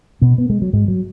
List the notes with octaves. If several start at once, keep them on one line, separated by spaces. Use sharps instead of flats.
B2 B3
B3
G#3
F#3
G#2 G#3
F#3